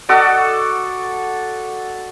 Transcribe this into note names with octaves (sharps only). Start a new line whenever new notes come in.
F#4 A4 D5 D#5